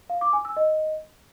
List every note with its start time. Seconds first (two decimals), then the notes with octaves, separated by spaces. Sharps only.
0.10 F5
0.21 D6
0.33 G#5
0.45 E6
0.57 D#5